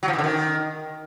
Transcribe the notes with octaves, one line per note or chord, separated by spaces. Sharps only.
F#3
F3
E3
D3
D#3